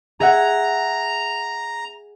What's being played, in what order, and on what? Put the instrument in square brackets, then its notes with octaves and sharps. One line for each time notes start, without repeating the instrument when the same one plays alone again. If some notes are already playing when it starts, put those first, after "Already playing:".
[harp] G#4 E5 F#5 [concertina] A#5